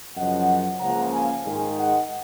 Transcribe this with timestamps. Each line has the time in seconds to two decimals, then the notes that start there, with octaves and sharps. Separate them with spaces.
0.16 F#2 C#3 F3 D#5 F#5
0.80 C#2 C#3 F3 A#3 F#5 A#5
1.13 F5 G#5
1.45 G#2 D#3 G#3 D#4
1.77 D#5 F#5